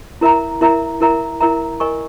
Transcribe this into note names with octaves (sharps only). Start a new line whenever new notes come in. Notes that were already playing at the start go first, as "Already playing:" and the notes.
E4 A#4 E5 A#5
E4 A#4 E5 A#5
E4 A#4 E5 A#5
E4 A#4 E5 A#5
A#4 D#5 G#5 C#6